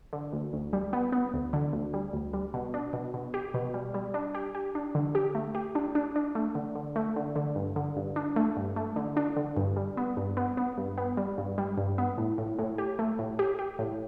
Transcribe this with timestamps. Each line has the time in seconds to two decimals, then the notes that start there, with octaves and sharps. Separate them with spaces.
0.13 D3
0.33 D2
0.53 D2
0.73 G3
0.93 B3
1.12 B3
1.33 D2
1.53 D3
1.73 D2
1.94 G3
2.13 D2
2.33 G3
2.54 B2
2.74 D4
2.93 B2
3.14 B2
3.34 G4
3.54 B2
3.74 G3
3.94 G3
4.14 D4
4.35 G4
4.55 G4
4.75 D4
4.95 D3
5.15 G4
5.35 A3
5.55 G4
5.75 D4
5.95 D4
6.16 D4
6.35 A3
6.55 D3
6.75 D3
6.96 A3
7.16 D3
7.36 D3
7.56 G2
7.76 D3
7.96 G2
8.16 D4
8.36 A3
8.57 G2
8.76 A3
8.96 D3
9.17 D4
9.37 D3
9.57 G2
9.76 G3
9.97 B3
10.17 G2
10.37 B3
10.57 B3
10.77 G2
10.98 B3
11.17 G3
11.38 G2
11.58 G3
11.78 G2
11.98 B3
12.18 A2
12.38 A2
12.59 A2
12.78 G4
12.99 A3
13.19 A2
13.39 G4
13.59 G4
13.79 A2